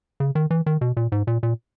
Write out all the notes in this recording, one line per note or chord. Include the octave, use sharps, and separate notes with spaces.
C#3
D#3
E3
D#3
B2
A#2
G#2
A#2
A#2